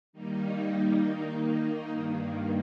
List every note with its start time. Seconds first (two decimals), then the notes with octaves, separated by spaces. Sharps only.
0.13 D#3 G3 A#3 D#4
1.02 D#3 A#3 D#4
1.92 G2 D#3 A#3